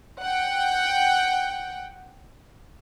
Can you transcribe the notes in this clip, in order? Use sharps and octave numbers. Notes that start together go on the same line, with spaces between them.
F#5 G5